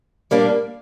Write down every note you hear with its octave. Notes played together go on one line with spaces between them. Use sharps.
G3 A#3 D4